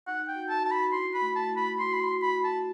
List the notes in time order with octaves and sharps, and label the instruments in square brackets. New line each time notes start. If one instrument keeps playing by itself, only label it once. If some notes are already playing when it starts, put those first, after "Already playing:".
[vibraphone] D#4 [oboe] F#5
[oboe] G5
[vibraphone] F#4
[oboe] A5
[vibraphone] F#4 [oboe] A5
[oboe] B5
[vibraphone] E4 [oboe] C6
[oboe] B5
[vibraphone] A3
[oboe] A5
[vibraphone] E4
[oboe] B5
[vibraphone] F#4 [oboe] C6
[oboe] B5
C6
[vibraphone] F#4
[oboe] B5
[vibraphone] F#4
[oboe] A5